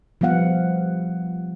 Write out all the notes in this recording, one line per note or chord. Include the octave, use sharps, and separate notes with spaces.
F3 G3 B3 F5 F#5